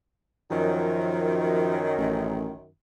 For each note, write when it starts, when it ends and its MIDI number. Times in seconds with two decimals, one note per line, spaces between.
0.51 2.68 42
0.51 2.68 51
0.51 1.90 53
1.97 2.51 33